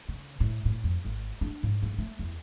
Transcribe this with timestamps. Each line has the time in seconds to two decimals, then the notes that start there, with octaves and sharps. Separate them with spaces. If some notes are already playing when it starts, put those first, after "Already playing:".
0.09 C#3
0.40 A2
0.65 A2
0.84 F2
1.05 G#1
1.41 D4
1.63 G#2
1.82 G2
1.99 A3
2.19 E2